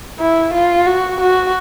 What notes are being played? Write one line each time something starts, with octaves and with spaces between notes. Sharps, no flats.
E4
F4
F#4
F#4